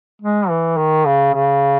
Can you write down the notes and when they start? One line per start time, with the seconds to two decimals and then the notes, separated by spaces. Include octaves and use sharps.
0.21 G#3
0.49 E3
0.77 D#3
1.06 C#3
1.34 C#3